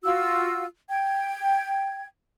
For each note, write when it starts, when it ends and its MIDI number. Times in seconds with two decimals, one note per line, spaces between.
0.04 0.64 65
0.04 0.64 66
0.04 0.64 88
0.89 2.06 79
0.89 2.06 92